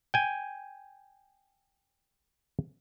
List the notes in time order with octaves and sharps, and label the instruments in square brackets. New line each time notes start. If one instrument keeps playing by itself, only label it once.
[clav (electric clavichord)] G5 G#5